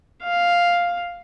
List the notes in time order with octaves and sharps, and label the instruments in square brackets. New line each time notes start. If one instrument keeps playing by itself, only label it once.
[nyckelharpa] F5